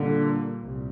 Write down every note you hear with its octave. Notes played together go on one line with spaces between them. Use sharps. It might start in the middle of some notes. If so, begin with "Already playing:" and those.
Already playing: A#2 D3 G3 A#3
C2 A#2